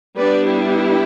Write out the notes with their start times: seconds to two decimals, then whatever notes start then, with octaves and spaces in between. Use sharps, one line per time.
0.17 G3 B3 D4 B4 D5
0.46 E4 G4